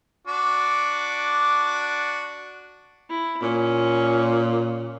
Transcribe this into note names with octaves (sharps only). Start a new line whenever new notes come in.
D4 F#4 D6
E4
A#2 C#4